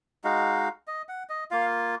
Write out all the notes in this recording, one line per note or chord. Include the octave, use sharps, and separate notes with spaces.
G#3 D#4 F#4 F5
D#5
F#5
D#5
A#3 F4 F5